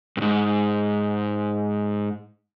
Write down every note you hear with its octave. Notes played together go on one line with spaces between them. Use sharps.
G2
G#2